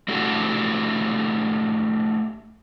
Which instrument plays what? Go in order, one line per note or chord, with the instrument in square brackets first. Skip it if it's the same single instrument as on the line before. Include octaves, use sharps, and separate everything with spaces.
[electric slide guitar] A3 D4 E4 F#4 G4 A4